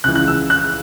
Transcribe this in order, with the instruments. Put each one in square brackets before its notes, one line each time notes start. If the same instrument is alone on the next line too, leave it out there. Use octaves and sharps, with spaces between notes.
[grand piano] C#2 C#3 E3 F#6
F#6
E6
F#6